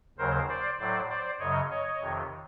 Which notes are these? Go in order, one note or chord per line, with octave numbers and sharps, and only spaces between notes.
D#2 C#3 F#3 A#4 C5
C5 D5
A2 F#3 C5 D5
C5 D5
F#2 C#3 F#3 C#5 D#5
C#5 D#5
F2 C3 D#3